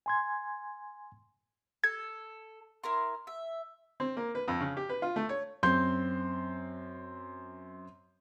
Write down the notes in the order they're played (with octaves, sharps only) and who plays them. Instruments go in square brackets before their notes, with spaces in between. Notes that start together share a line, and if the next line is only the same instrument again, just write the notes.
[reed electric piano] G#5 C6 G#6
[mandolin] A4 [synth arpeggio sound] G#6
[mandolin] E4 A#4 C6
E5
[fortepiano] C4
A#3
B4
F2
C#3
G4
B4
F4
A3
C#5
[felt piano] F#2 C4 C6 G6